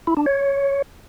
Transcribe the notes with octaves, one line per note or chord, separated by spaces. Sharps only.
E4
D4
C#5